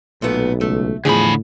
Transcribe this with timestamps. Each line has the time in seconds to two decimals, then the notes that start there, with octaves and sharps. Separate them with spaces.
0.22 B1 A#2 A3 B3
0.61 C#2 A3
1.05 E2 A2 D3 F3 G#4 B5